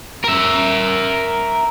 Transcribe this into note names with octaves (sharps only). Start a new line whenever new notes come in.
A#4 E5